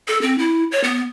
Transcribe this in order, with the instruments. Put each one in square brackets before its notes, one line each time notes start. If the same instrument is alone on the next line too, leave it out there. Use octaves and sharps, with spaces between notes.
[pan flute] A4
C4
E4
C#5
B3